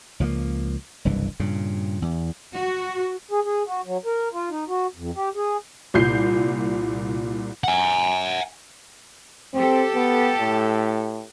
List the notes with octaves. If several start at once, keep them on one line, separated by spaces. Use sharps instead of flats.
C#2 F3 A3 A#3
F#1 C2 G2 E3
G2 A#2 C#3
E2
F#4
G#4
G#4
F#4
F#3
A#4
F4
D#4
F#4
F2
G4
G#4
C2 A#2 G6 C7
F#5 G#5
C4 G4 A4
B3
A2